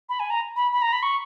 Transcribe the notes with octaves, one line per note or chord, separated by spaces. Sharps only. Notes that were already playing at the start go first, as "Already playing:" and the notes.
B5
G#5
A#5
B5
B5
A#5
B5
C#6